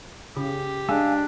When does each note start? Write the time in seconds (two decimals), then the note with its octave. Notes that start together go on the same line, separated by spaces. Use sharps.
0.37 C#3 G4
0.89 G#3 D4 F5 G#5 E6